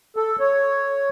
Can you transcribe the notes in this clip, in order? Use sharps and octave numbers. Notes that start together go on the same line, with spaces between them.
A4
C#5